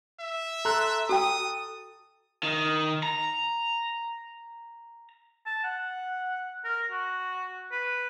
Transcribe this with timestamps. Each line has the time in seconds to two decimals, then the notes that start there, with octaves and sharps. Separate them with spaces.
0.20 E5
0.65 A4 A#5 C6 F#6
1.09 F#4 G5 D#6
2.43 D#3
3.03 A#5
5.46 A5
5.64 F#5
6.64 A#4
6.91 F#4
7.72 B4